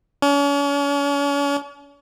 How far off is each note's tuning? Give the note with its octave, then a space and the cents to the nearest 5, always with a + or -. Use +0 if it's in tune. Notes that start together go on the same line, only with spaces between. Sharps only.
C#4 +40